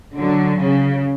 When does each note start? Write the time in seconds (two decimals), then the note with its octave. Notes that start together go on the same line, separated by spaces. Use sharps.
0.16 D3 F#3
0.57 C#3